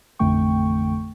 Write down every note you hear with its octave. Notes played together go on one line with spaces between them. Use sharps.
A1 F2 D3 A3 G5 C#6